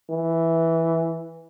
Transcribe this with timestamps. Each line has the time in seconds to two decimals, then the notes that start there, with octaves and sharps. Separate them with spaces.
0.10 E3